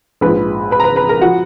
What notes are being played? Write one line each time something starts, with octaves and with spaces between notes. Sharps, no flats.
A#1 G#2 F3 B4 B5
B4 B5
A#5
B4 B5
B4 B5
A#4 A#5
F3 F#4 F#5